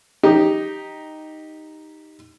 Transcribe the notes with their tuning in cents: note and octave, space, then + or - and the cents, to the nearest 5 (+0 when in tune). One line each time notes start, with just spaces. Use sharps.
D#4 +0 G4 +0